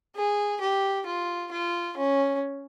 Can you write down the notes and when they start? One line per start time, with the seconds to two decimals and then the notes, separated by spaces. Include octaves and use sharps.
0.16 G#4
0.61 G4
1.06 F4
1.51 F4
1.97 C#4